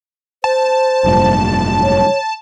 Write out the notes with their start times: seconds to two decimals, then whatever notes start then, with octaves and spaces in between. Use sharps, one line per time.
0.44 C5 A5
1.04 F1 G2 A#2
1.83 C#5